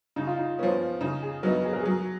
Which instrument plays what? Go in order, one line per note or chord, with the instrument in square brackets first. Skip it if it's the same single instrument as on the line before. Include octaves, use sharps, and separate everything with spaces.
[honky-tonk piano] C#3 [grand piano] D#4
[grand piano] F4
D#4
[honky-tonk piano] F3 B3 [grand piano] C#4
[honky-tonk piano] C#3 [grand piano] D#4
[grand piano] G#4
[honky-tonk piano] F#3 B3 D#4 [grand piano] A#4
[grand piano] G#4
A#4
[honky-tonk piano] F#3 [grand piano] G#4